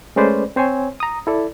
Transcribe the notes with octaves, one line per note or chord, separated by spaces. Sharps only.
G#3 A3 C#4 B4 C5 D5
C4 C5 C#5 G#5
A#5 D#6
E4 A4 D5